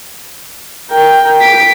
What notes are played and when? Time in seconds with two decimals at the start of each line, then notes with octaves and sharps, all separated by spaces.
0.91 A#4 G5
1.41 B6 D7